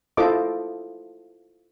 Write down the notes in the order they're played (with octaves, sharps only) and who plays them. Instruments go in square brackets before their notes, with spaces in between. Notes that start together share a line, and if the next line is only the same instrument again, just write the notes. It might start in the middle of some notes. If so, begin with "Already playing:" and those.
[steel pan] E4 F4 A4 C5 D#5 D6